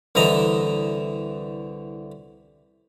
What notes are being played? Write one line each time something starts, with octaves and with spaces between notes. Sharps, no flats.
C2 D3 E3 D#5 A#5